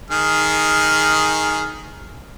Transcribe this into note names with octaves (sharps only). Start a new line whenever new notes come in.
D#3 G#4 F6